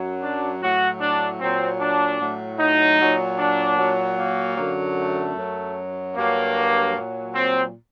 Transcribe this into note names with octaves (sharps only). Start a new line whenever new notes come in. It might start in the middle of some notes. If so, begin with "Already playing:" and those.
Already playing: F#2 F#3
D4
A2 F#3 F#4
D4
A#2 F#3 C4
D4
A2 F#3
D#4
A#2 F#3
D4
A#2 F#3
A#3
F#2 D3 F#3
A3
F#2 F#3
G2 F#3 A#3
A#2 F#3
C4